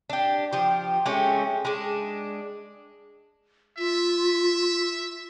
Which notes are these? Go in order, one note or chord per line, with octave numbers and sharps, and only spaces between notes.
D4 G4
F3 G4
G#3 A3 C#4 G4
G#3 D4
F4 E5